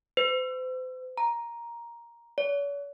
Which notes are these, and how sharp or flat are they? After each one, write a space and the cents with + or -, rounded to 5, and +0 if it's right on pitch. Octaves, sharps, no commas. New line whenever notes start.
C5 -40
A#5 +10
C#5 +45